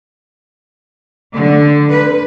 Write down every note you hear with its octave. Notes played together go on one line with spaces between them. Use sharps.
D3
B4